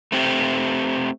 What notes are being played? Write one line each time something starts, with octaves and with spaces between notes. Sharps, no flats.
A3 C4 G4